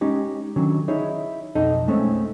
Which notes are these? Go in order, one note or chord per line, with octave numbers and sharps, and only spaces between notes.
G#3 C#4 D#4 G4
D3 D#3 F#3 C#4
D#4 E4 G#4 C#5 D#5
B1 F2 D#4 A4 D#5
G#3 A3 C4 C#4 D#4